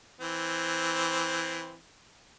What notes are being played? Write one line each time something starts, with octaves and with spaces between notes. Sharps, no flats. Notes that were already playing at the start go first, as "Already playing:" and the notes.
E3 C4